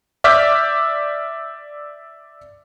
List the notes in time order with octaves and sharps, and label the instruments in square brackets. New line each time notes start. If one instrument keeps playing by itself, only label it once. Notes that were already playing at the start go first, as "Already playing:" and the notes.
[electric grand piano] D5 E5 D6 F6 G6 B6